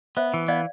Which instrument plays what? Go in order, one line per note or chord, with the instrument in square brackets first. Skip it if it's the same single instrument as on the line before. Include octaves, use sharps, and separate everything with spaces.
[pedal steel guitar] B3 [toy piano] C5 E5
[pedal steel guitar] E3
[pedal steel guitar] B3 [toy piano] D5 F5